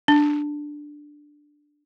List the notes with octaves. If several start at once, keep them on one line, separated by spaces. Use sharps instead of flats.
D4